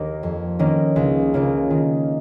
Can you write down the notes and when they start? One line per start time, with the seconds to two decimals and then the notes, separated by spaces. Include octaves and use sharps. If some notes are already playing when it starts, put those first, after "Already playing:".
Already playing: D#2 D#3 A#3
0.23 F2
0.59 D#3 A#3 C#4
0.96 C#2
1.34 C#3 A#3 F4
1.70 D#3